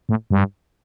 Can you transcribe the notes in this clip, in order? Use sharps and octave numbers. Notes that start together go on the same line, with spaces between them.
A2
G2